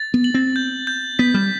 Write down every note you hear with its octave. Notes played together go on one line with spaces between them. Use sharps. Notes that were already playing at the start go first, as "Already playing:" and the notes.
Already playing: A6
B3
F#7
C4
G6
G6
B3 B6
G3